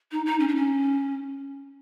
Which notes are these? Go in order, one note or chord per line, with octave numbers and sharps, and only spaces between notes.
D#4
D#4
C#4
D4
C#4